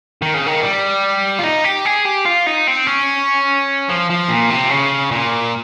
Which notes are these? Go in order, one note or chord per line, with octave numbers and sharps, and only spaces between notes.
D#3
C#3
D#3
G3
F4
D#4
G4
G#4
G4
F4
D#4
C4
C#4
F3
F3
A#2
C3
C#3
A#2